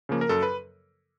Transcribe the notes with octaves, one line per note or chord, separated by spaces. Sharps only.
C#3 F3 A#3
A#4
F#2 A4
B4